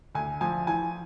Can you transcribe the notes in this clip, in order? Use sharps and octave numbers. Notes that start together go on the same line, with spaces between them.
D2 G#5
F3 G#5
E3 G#5